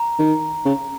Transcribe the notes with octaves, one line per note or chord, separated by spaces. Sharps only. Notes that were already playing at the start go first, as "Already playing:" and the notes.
Already playing: A#5
D#3
C#3